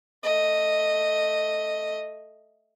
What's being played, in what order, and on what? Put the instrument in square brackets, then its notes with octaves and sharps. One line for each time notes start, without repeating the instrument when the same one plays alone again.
[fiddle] A3 D#5